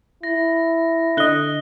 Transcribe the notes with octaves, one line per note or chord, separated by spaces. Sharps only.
E4 A#6
D3 D#5 F#6 G7